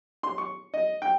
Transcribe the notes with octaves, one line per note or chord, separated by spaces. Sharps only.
C6
C#6
D#5
G5